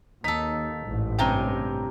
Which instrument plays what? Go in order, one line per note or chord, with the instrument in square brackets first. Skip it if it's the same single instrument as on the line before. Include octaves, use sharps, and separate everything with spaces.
[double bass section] D#2 [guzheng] D#4 A4 [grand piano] B6
[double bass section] A1 G#2
[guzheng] G2 C3 C#4 [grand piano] G5 A#5 G7